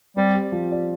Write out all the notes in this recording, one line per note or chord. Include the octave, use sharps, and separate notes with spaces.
G3 C4
G4
F3
D5